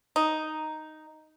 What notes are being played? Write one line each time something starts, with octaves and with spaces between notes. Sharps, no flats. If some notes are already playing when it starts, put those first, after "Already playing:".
D#4